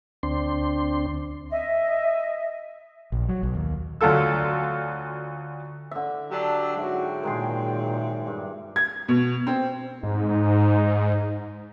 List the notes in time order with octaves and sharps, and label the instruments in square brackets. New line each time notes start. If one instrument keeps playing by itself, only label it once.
[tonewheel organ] D2 C4 D4 C6
[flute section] D#5 E5
[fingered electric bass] A#1
F#3
B1
D#2
[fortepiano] D2 F#3 F4 A4 E6
[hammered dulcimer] D3 E5
[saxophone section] F#3 D4 G4 [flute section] A5 E6
[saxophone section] G#2 F#3 E4 [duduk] F#4 [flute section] G5
[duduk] A#2 [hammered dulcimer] D#3 G#3 C6
[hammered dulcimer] G2
[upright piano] G#6
B2
C4
[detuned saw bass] G#2 [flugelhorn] D#4